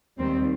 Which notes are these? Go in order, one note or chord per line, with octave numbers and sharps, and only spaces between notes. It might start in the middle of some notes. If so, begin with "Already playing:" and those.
D#2 D#3 G3 C4